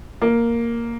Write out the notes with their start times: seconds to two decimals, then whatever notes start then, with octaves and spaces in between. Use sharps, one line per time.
0.22 A#3